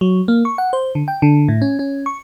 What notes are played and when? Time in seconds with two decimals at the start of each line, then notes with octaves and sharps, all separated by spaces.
0.01 F#3
0.28 A#3
0.45 C#6
0.58 F#5
0.73 C5
0.95 D3
1.08 G5
1.22 D3
1.48 A2
1.62 C#4
1.79 C#4
2.06 C#6